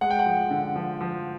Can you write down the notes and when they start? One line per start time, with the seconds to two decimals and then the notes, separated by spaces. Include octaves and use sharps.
0.01 G#3 F#5
0.10 G5
0.19 F#5
0.26 F3
0.51 D3
0.76 F3
1.01 F3